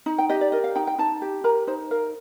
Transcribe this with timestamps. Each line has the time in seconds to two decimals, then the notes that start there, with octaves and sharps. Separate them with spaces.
0.06 D#4
0.18 G5
0.29 G4 D#5
0.41 D5
0.52 A#4 D#5
0.64 F5
0.75 D#4 G5
0.87 G5
0.98 D#4 A5
1.22 G4
1.44 A#4 A#5
1.67 D#4 C5
1.91 A#4 F5